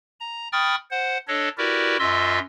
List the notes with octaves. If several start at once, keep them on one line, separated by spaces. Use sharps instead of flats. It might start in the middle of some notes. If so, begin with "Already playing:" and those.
A#5
G5 B5 C#6 D#6 F6 A6
C5 F#5
D4 A4 C#5 D#5
E4 F#4 G4 A#4 B4 D5
F#2 F4 D#5 E5 C6 E6